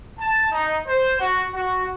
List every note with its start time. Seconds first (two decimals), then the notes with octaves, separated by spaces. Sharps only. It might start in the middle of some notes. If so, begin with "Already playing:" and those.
0.19 A5
0.51 D#4
0.87 C5
1.20 F#4
1.54 F#4